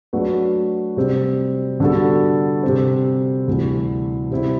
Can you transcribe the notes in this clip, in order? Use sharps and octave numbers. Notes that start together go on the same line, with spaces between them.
F#3 A3 D4 F#4 B4
C3 G3 C4
D3 G3 B3 F#4 A4
C3 G3 C4
D2 C3 E3 G3
C3 G3 C4 E4